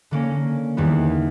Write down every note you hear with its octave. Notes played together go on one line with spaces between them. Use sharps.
D3 A#3 C#4
E2 D#3 G3 B3